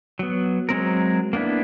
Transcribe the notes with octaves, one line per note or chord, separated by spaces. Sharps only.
F#3 B3
F#3 G#3 C4 A#4
A#3 B3 D4 E4